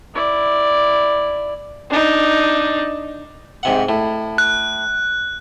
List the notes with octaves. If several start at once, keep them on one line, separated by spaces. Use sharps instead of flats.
E4 D5
D4 D#4
G#2 C3 F#5
A2
F#6